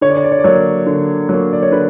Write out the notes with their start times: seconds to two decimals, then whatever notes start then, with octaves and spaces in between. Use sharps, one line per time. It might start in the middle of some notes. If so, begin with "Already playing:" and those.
0.01 D3 C#5
0.10 D5
0.16 C#5
0.24 D5
0.31 C#5
0.39 D5
0.44 F#3 A#3 C#5
0.86 D3
1.29 F#3 A#3
1.53 D5
1.62 C#5
1.72 D3 B4